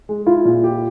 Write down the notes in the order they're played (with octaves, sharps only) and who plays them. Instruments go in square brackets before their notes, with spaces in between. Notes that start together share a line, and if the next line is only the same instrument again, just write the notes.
[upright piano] G#3
[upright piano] E4 [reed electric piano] F4
[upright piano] A#2
G4